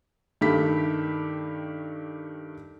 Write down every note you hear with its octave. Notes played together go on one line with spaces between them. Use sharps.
G2 D#3 A3 G4 B5 B6